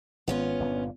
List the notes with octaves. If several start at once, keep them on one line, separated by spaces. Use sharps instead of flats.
G#1 B3 C#4 F4
G1 G2 A#2